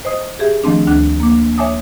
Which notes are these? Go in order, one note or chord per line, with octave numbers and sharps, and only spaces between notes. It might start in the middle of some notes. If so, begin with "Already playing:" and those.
C5 D#5 D#6
G4 G#4 E5
D#3 F3 A3 C4 D4
D2 D4 F#6
A#3 D6
C#5 E5 G#5 A5 D6 D#6